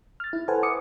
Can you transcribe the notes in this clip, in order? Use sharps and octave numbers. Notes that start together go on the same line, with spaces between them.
F6 A6
E4
A4 B4 C5 F#5 G#5
C5 D6 D#6 C#7